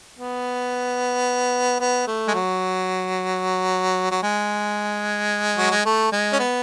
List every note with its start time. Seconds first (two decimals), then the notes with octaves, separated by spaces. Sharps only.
0.18 B3
1.80 B3
2.07 A3
2.28 G#3
2.34 F#3
4.11 F#3
4.23 G#3
5.58 F#3
5.71 G#3
5.85 A3
6.12 G#3
6.33 C#4
6.39 B3